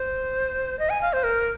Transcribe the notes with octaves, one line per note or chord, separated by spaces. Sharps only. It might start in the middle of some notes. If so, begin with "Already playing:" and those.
Already playing: C5
D#5
G#5
F5
C5
A#4